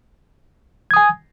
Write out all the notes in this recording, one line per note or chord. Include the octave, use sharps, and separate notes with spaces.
G#5 D#6 G#6